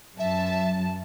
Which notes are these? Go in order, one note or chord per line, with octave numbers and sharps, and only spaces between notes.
F#2 E5 A5